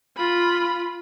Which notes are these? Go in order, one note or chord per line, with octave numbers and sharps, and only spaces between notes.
F4 B5